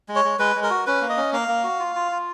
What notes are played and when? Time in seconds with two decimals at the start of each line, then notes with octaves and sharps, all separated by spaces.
0.08 G#3
0.16 C#5
0.24 G#3
0.39 G#3 B4
0.56 G#3
0.63 A#4
0.70 F#4
0.86 C#4 B4
1.01 A#3
1.09 D#5
1.17 C#4
1.33 A#3 F5
1.48 A#3
1.64 F#4
1.80 F4
1.96 F4
2.12 F4